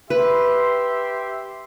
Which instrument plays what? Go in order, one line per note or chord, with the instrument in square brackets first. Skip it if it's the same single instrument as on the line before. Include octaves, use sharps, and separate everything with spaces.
[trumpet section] G4 E5 C6 [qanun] B4